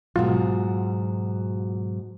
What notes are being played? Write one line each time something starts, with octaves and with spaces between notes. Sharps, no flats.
G#2 B2 F#3 F4